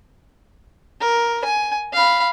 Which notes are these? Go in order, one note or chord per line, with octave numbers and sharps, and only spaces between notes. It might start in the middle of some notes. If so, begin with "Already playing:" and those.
A#4
G#5
F5 B5